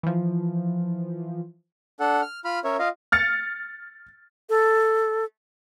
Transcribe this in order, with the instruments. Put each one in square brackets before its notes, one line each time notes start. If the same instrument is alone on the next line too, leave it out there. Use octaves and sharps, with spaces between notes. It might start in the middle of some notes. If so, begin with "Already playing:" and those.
[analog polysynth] E3 F3
[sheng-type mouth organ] D4 A4 F#5
F6
F4 B5 F6
C#4 A#4 C#5 E5
F4 D#5 F5
[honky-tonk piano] F6 A6 C#7
[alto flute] A4